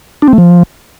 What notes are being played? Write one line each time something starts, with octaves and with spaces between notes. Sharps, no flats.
D4
C4
A3
F3